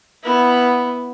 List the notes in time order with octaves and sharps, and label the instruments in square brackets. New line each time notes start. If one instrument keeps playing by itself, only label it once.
[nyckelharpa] B3 E4